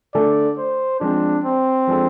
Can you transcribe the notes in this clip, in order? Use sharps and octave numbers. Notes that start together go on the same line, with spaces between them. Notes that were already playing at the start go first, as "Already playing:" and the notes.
D3 A3 D4 A4 D5
C5
F3 G#3 C4 D4
C4
F3 G#3 D4 A4